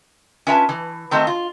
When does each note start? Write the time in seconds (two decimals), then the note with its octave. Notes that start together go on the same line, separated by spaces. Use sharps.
0.47 C#4 F4 B4 E5 G#5 A5
0.69 E3
1.11 D#3 A3 C4 F#4 C5 D#5
1.27 F4